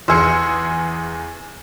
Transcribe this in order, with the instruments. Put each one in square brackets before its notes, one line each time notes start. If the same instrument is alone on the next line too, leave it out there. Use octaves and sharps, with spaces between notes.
[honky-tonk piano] E2 G#4 C#7 [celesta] C6 E6 F6